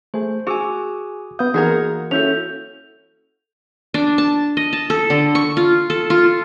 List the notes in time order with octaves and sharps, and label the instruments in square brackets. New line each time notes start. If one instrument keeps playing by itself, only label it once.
[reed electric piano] A3 G#4 [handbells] C5
[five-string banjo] F#4 [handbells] G#4 G#5 [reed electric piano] C#6 D6 E6
[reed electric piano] B3 F5 [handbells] D#6 G6
[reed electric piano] E3 [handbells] A#3 F#5 G#6 [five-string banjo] D#4 F#4 A#4 [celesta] G#4
[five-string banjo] C#4 E4 F#4 [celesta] A4 G6 F7
[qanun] D4
A5
D#5
A5
A4
D3
C#6
F4
A4
F4